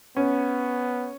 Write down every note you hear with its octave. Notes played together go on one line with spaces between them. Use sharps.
B3 C#4